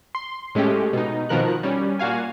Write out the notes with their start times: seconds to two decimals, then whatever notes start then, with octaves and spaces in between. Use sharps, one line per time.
0.15 C6
0.55 A2 G#3 A3 C#4 G4
0.93 B2 D#4
1.29 B2 D#3 F3 A#4 F#6
1.63 G3 C#4
1.99 A#2 F#4 F5 G#5